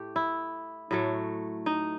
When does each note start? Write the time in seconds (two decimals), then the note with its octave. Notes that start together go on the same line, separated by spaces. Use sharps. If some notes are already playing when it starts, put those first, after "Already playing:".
Already playing: A2 A3 G4
0.16 E4
0.91 A2 F#3 A3
1.66 D#4